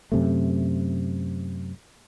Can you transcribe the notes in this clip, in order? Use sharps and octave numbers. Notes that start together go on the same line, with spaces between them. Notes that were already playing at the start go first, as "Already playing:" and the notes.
F#2 C3 A3